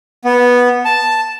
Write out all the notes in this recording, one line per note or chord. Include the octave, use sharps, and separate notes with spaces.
B3
A5